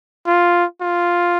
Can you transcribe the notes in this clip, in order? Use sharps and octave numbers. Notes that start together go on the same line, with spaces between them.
F4
F4